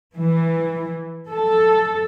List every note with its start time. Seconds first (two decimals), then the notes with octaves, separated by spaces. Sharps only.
0.16 E3
1.32 A4